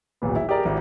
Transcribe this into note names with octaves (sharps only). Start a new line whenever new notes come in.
D1 G#1 A#2 B3
E4
G4 G#4 A#4 D5 A#5
G#1 E4 G4